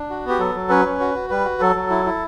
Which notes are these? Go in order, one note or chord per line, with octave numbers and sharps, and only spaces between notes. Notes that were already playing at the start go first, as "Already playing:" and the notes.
Already playing: D4
F#4
B3 G4
F#3 A4
F#3
C#4 B4
C#4
F#4
F#4
G3 B4
F#4
F#3 A4
F#3
E4
E4